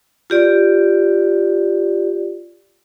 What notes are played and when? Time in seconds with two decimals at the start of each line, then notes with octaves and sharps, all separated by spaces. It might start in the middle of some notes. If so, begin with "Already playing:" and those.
0.30 F4 G4 D5